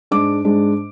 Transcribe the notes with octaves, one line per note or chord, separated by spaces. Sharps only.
G#2 G#3 D4 D6
G#2 G#3 D4